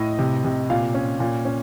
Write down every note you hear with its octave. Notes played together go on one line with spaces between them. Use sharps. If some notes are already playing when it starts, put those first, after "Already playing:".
Already playing: A2 D#5
C3
C3
A#2 F5
C#4
A#2
C#4